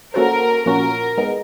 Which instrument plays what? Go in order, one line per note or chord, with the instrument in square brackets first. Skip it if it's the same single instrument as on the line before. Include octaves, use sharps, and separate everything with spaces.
[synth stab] A#3 C#4 F#4 A4 C5 [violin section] A#4
[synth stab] A#2 F3 A#3 C#4 F#4 [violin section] A#4
[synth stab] G#3 B3 D#4